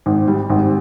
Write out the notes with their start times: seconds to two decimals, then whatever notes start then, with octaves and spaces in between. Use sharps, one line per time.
0.06 G#1
0.28 G3
0.49 G#1